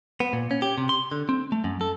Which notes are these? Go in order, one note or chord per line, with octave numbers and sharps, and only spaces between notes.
B3
A#2
C#4
G4
C3
C6
D3
C4
A3
F#2
A4